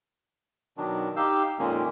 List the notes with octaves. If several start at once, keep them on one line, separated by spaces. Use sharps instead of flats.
B2 D#3 F#3 D4
D#4 G4 F5 E6 G6
F2 A#2 D#3 G#3 A#3 C#4